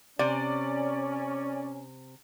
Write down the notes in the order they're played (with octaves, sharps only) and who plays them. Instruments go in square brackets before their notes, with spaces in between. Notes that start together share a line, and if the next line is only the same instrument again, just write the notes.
[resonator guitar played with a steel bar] C3 [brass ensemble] C#4 [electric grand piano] D5